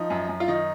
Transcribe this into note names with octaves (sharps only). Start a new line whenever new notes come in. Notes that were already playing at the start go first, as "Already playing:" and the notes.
Already playing: F3 D#4
F#2
F#2
F4
D#3 D#4